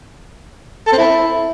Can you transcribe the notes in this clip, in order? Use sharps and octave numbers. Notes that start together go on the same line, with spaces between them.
A4
C4
E4